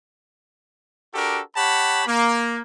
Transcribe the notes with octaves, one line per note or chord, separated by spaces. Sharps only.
D4 F#4 G4 A4 A#4
G4 C#5 F#5 A5 B5
A#3